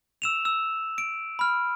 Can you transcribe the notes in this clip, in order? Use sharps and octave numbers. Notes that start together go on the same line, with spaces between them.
E6 E7 F7
E6
D7
B5 F6